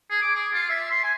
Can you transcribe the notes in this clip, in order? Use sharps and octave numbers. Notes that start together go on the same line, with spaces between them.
G#4
D6
G#4
F4
E5
C6
G#5